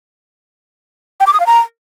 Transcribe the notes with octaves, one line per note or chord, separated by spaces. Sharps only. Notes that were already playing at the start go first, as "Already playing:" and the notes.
G5
D6
D#6
F5
A#5